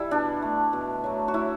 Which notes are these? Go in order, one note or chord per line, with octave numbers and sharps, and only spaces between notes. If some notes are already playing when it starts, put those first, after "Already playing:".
Already playing: G3 E4 E5
B2 D4
A3
B2
F#3 A3
F#4
A2 E4